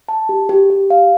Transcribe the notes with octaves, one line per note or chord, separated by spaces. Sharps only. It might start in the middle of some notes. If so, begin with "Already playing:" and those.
A5
G4
G4
G4
F5